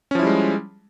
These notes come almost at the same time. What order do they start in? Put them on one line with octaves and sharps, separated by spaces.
C#4 F3 E4 G3 G#3